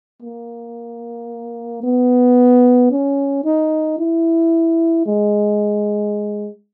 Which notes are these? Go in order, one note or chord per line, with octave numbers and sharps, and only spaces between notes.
A#3
B3
C#4
D#4
E4
G#3